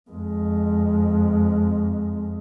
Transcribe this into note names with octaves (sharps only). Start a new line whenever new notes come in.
F2 G#3